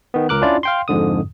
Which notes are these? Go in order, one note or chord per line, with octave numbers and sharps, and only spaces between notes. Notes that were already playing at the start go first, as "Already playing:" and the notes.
D#3 B3
C#2 A#4 D6 F#6
C#4 D4 E4 F4 D5
F5 G5 C6
F2 G#2 D3 D#6